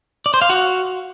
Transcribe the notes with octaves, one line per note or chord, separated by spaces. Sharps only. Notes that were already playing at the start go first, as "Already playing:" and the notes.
D5
C5
F5
F#4